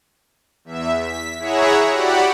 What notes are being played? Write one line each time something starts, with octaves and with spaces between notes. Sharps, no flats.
E2 E5
B6
E4 G#4 C#5 E5 F#5 A#5
F#4 G4 D5 F#5 B5